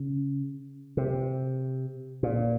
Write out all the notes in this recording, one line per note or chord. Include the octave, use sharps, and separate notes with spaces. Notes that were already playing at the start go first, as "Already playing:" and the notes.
Already playing: C#3
C3
A#2